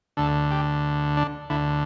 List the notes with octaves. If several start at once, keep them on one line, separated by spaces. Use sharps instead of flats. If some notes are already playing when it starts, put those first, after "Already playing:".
D2 D3 A4
G4
D4
D2 D3 E4